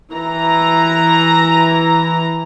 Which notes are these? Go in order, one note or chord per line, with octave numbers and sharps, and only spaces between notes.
E3 A#5